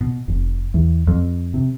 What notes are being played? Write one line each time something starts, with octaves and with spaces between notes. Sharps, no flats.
B2
F1
E2
F2
C3